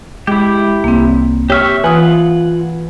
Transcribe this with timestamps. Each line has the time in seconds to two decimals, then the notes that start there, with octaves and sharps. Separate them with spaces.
0.27 G#3 E4 G4
0.84 C2 A#3 C4
1.50 G4 C#5 E5 C#6 F6
1.84 E3 F4 B4 F#5 G#5 D#6